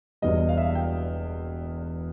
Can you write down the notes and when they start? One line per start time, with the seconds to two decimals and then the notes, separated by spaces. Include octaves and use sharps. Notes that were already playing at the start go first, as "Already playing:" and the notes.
0.22 E1 E2 B2 G3 D#5
0.49 F5
0.57 E5
0.66 F5
0.75 G5